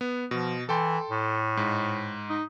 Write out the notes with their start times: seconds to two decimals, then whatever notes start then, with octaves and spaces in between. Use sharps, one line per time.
0.01 B3
0.31 B2 F3
0.69 E3 A4 G5 C6
1.11 A2
1.57 G#2
2.30 D#4